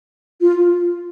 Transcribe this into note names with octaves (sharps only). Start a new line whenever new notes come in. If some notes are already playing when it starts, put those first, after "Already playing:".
F4